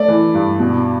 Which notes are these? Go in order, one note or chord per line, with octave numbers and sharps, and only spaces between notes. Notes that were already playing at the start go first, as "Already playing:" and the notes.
Already playing: A3 D5
E3
G2
B2